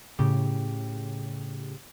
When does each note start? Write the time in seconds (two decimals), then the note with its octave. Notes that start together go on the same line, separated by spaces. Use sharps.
0.19 A2 C#3 G4